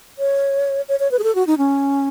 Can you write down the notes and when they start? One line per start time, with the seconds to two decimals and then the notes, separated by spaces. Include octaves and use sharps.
0.19 C#5
0.89 C#5
1.00 C#5
1.11 B4
1.19 G#4
1.24 A4
1.35 F#4
1.47 D#4
1.58 C#4